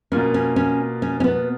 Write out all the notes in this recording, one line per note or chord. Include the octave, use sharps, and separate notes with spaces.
B2 A#3 C#4 F4 A#4
C#4
C#4
C#4
C#4
B3